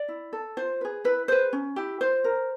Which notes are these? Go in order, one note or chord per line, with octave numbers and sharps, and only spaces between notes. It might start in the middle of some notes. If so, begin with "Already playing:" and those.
Already playing: D5
E4
A4
F4 C5
G#4 B4
E4 B4
G#4 B4 C5
C#4
E4 G4
F4 C5
A#4